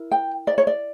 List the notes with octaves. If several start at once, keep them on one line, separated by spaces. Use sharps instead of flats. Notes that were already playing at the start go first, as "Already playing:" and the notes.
Already playing: E4 A#4
G5
D5
C#5
D5